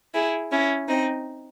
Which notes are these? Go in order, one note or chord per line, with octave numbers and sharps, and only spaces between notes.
E4 G#4
C#4 E4
C4 D#4